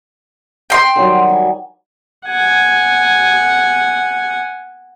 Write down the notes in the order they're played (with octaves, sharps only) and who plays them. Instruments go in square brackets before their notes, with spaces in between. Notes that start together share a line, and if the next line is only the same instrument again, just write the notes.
[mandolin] G5 C6
[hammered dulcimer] D#3 F#3 G3
G#5 B5
[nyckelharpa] F#5 G#5